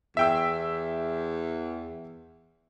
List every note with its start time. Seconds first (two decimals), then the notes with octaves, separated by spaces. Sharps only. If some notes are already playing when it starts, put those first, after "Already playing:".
0.17 E2 E5 G5 E6